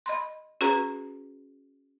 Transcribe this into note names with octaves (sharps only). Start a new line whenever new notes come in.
D#5 B5 C6
C#4 F#4 G#4 B4 A#5